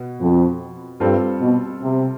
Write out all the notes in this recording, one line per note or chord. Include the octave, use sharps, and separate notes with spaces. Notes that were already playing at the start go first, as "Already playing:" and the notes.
Already playing: B2 B3
F2
G2 G3 C4 F4 A4
B2
C3